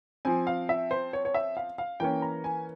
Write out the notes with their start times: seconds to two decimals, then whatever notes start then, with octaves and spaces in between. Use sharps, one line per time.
0.25 F3 C4 G#5
0.47 F5
0.69 E5
0.91 C5
1.13 C#5
1.25 C#5
1.34 E5
1.57 F5
1.78 F5
2.00 E3 A#3 C#4 G5
2.22 A#5
2.44 G#5